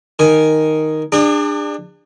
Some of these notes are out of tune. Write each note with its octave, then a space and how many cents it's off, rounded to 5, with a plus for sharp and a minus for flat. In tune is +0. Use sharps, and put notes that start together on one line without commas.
D#3 +0 G#5 +0
D4 +20 G#4 -40 A5 +40